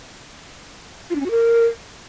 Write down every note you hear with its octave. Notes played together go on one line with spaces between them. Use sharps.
F4
D4
C#4
F#4
A#4